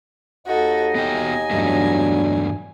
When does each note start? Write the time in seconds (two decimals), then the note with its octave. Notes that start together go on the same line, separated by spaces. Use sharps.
0.47 D#2 D#4 F#4 A4 D#5
0.95 B3 F#4 G5 G#5
1.51 E2 G2 F#3 A3 B3 D4